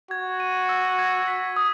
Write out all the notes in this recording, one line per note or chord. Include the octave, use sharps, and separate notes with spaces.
F#4 G#6
D#7
E6
G#6
B6
D#6